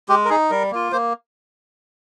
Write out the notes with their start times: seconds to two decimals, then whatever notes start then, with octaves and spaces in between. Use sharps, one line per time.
0.09 G#3 G4
0.25 A#4
0.30 D#4 G#4
0.51 G3 A#4
0.71 A#3 F4
0.92 A#3 C5